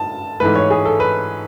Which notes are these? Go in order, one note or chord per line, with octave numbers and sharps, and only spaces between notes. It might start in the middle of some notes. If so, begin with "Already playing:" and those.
Already playing: A5
G#2 E3 A3 B4
C#5
G#4
A4
B4